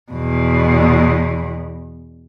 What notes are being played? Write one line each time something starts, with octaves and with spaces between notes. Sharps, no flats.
E2 B2